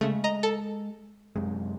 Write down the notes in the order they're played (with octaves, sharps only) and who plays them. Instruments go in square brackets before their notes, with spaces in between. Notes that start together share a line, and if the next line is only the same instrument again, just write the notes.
[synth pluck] C#3 A3 [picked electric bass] G#3
[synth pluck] D#5 A#5
A4
[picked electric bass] F#2 C3 G#3